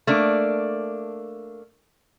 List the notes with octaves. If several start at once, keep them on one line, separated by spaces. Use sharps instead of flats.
A3 A#3 D4